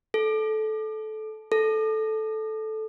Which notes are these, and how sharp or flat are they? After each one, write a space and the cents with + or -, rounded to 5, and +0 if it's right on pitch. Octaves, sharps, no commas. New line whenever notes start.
A4 -20
A4 -10